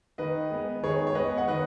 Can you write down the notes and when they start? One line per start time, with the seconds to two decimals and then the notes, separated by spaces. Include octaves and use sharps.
0.18 D#3 B4 D#5
0.51 G#3 B3
0.83 D#3 G#4 C#5
1.07 C#5
1.15 G#3 B3 B4 D#5
1.38 F#5
1.48 D#3 B4 D#5